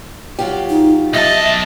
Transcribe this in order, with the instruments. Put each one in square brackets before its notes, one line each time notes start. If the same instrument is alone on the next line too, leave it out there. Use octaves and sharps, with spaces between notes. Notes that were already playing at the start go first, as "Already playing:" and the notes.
[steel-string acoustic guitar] F#3 F4 G4
[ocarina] D#4
[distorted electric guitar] B1 A5 [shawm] D#5 [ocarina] E5